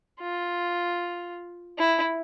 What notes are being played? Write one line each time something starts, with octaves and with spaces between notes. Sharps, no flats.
F4
E4